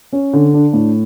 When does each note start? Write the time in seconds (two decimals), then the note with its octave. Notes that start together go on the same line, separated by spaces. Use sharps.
0.13 C#4
0.33 D3
0.54 D4
0.73 A2